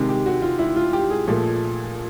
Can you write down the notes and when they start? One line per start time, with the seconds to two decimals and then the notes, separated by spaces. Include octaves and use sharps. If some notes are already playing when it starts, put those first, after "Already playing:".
Already playing: C3 D#3 G#3
0.09 G4
0.26 F#4
0.42 F4
0.59 E4
0.76 F4
0.93 G4
1.10 G#4
1.27 A#2 F3 A3